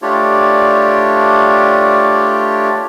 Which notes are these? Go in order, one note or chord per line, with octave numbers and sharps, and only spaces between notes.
A3 D4 F4 G4 C#5 D5